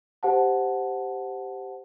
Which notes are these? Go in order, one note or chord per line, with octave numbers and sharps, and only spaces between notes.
G4 C5 F#5 A5